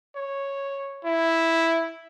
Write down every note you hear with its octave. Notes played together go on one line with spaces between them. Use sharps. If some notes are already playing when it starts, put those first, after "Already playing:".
C#5
E4